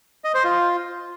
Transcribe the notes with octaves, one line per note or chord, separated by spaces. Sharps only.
D#5
C5
F4